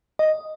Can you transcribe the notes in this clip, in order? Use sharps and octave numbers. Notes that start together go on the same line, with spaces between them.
D#5